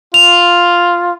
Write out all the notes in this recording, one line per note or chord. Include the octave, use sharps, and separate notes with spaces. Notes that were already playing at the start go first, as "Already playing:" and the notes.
F4 F7